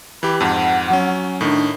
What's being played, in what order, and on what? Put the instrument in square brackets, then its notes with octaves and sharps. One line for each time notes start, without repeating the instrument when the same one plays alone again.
[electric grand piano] E3 G4 [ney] B5
[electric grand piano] F2 G#2 [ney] F#5
[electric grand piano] F#3 C#4
[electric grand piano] A2 D#3 [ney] D4